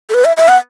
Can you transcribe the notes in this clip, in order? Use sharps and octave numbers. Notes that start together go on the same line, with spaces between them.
A4
B4
E5
E5
F#5